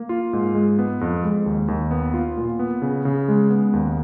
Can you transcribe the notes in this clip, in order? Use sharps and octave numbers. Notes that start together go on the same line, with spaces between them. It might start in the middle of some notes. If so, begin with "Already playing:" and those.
Already playing: A#3
F4
G#2
G#3
B3
F2
G#3
D#2
D#2
B3
F4
A#2
B3
C#3
C#3
G#3
B3
D#2